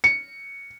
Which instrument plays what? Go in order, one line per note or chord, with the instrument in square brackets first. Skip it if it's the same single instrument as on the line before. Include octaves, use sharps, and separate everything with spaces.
[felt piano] C#7